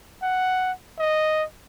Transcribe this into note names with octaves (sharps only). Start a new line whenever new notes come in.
F#5
D#5